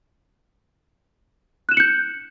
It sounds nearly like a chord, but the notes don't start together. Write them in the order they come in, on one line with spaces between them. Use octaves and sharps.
F#6 E7 F#7 C#7 G6